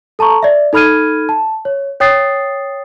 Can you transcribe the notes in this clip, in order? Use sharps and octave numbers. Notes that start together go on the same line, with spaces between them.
A4 A5 A#5 C#6
D5 E5
D#4 A4 B5 F6 G#6 D#7
A5
C#5
C#5 G5 D#6 A6 C7